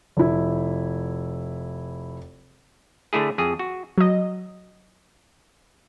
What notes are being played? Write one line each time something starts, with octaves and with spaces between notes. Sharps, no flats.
F1 E4
D3 A3 E4 G#4
F2 G#4
F#4
F#3 D#5